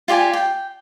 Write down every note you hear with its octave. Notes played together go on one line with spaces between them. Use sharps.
F4 G4 D5 G#5
G5